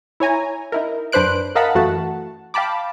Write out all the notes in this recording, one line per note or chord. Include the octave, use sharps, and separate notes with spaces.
E4 C#5 G#5 A#5
D#4 E4 A#4
F#2 D4 B4 C5 F#6 D7
A#4 D#5 F5 F#5 A5 B5
F#2 E3 A3 F#4 F#5 A5
F5 G5 A5 B5 D6